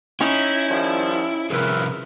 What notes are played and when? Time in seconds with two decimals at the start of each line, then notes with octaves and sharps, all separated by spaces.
0.20 C#4 D#4 E4 C#5
0.68 D#3 F3 G3
1.50 C3 F3 G#4 A#4 B4 E5